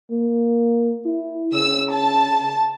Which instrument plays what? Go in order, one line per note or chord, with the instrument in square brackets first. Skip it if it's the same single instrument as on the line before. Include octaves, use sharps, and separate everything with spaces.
[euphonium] A#3
E4
[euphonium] C#3 [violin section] E6
[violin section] A5